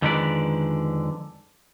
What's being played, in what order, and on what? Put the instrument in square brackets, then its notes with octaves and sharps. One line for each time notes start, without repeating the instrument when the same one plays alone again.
[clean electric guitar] F2 D3 D#3 G#3 B4 D5